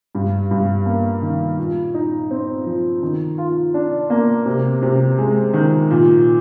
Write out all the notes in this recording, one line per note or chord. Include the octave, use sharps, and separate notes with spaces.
G2
G2
A#3
D#3
A#2
D#4
C4
F3
D#3
F4
D4
A#3
C3
C3
G#3
D#3
A#2